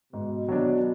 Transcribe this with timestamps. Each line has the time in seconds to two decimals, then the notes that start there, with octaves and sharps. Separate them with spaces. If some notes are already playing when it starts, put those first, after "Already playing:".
0.13 G#2 B2
0.48 F#3 B3 D4